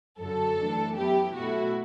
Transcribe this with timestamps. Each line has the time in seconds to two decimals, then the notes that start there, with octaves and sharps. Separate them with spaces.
0.20 F#2 D3 F#3 A4
0.59 F#2 E3 A3 D4
0.97 F#2 F#3 B3 E4 G4
1.36 B2 A3 E4 F#4